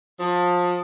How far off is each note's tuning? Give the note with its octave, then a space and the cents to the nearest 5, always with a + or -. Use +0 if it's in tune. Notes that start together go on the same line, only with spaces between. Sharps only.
F3 +25